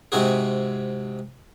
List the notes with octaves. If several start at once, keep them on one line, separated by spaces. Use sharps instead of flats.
G#2 C3 C4 F#4 G#4